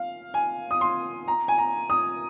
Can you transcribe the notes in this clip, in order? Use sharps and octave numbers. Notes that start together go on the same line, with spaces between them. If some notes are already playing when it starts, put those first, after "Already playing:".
Already playing: F5
G#5
D#6
C6
A#5
G#5
A#5
D#6